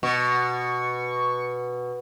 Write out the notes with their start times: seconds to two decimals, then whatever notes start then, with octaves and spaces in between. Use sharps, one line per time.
0.03 B2 C#6